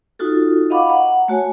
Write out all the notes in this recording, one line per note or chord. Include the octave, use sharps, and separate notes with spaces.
D#4 F4 F#4 A4
D#5 F5 F#5 B5 C#6 D6
F#5 A#5
A3 F#4 C#5 G#5